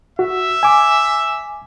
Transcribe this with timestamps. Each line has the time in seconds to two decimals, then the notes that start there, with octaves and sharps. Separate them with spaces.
0.19 F#4 E5
0.63 G#5 D6